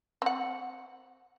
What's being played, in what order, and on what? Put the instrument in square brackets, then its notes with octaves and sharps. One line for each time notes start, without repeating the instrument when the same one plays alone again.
[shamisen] C4 F#5